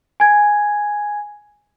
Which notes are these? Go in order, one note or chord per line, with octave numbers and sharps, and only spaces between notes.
G#5 G#6